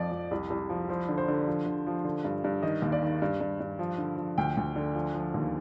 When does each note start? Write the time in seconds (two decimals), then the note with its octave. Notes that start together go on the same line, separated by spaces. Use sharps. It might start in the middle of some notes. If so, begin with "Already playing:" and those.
Already playing: F2 F3 D5
0.12 F2
0.31 C2
0.50 C2
0.70 F3
0.89 F3 C5
1.09 D3
1.18 C5
1.28 D3
1.47 F3
1.66 D3
1.86 F3
2.05 D3
2.24 G2
2.44 G2
2.63 D#3 D#5
2.82 D#2
2.92 D5
3.02 D#3
3.22 G2
3.41 G2
3.60 G2
3.79 F3
3.98 D3
4.17 F3
4.38 D2 G5
4.57 D2
4.76 D3
4.94 F3
5.14 F3
5.34 D#2